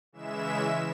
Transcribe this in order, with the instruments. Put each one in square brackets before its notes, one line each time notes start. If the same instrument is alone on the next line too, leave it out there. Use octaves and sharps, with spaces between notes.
[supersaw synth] C#3 E3 G#3 E5 E7